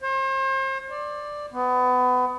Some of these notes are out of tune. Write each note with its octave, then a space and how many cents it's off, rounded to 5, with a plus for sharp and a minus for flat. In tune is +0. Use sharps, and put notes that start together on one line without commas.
C5 +40
D5 +5
B3 +25